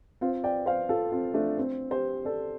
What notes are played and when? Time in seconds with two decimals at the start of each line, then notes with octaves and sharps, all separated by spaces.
0.21 C4 F4
0.44 D5 G5
0.66 C5 F5
0.89 F4 A4
1.12 C4 F4
1.34 A3 D4
1.58 C4
1.91 G4 C5
2.25 A4 D5